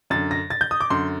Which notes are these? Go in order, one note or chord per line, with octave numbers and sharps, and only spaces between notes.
F#2 D3 A6
A#6
A6
G6
D#6
D6
F#2 D3 C6